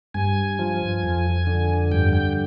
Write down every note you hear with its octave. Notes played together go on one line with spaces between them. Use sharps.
G2 G#5
F3
F2
D3
G2 G5
G5